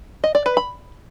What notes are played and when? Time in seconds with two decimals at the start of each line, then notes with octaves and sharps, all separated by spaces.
0.24 D#5
0.35 D5
0.46 B4
0.57 B5